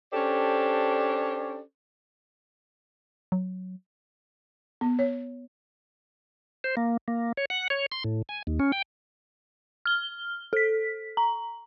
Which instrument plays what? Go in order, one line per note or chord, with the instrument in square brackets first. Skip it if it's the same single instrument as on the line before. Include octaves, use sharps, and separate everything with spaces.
[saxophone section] C#4 D4 G4 A4 C5 D5
[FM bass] F#3
[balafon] B3
C#5
[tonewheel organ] C5
A#3
A#3
C#5
F#5
C#5
C6
A2
G#5
D#2
C#4
G5
[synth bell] F6 G7
A4 B6
A#5